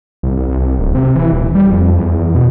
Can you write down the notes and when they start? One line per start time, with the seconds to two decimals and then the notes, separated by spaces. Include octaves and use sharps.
0.23 C2
0.36 C2
0.49 C2
0.79 D1
0.95 C3
1.16 E3
1.32 D#1
1.55 G3
1.71 F2
1.97 E2
2.35 B2